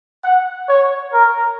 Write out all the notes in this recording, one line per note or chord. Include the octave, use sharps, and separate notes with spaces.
F#5
C#5
A#4